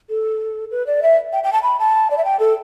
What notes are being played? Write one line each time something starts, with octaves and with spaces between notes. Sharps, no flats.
A4
B4
D5
E5
G5
G5
A5
B5
A5
D5
E5
G5
A4